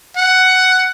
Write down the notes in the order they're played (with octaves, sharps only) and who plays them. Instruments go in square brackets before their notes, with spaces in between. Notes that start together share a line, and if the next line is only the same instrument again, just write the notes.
[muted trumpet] F#5